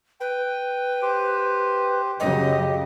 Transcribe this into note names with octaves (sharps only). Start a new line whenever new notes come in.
B4 G5
G4 C5
F#2 C#3 F#3 G4 D#5